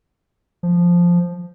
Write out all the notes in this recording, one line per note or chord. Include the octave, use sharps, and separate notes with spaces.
F3